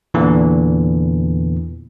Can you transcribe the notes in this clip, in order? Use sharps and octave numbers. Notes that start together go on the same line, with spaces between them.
E2 A#2 D3 E3